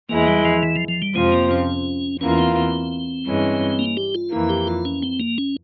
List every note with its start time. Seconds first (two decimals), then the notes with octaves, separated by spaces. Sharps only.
0.09 E2 E3 G#3 A#3 E4
0.27 G3
0.45 F3
0.63 E3
0.76 F3
0.88 F3
1.02 G3
1.15 F2 C3 F3 G#3 C4 F4
1.32 A#3
1.51 C#4
2.21 E2 E3 A#3 C#4 F4
2.38 C4
2.56 C4
3.26 G2 E3 G#3 C#4
3.79 A#3
3.97 G4
4.15 F4
4.32 F2 E3 A#3 E4
4.49 G4
4.67 F4
4.85 C#4
5.02 C4
5.20 A#3
5.38 C#4